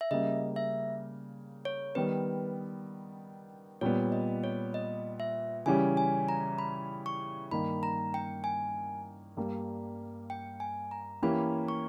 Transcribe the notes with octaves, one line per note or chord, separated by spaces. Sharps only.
E5
C#3 G3 A#3 D#5
E5
C#5
D#3 G3 B3 B4
A#2 G3 B3 C#5
D#5
C#5
D#5
E5
C#3 E3 G3 C#4 G4 G#5
G#5
A#5
B5
C#6
G2 D#3 A#3 D#4 B5
A#5
G5
G#5
G2 G3 A#3
G5
G#5
A#5
E3 A#3 C#4 G4 B5
C#6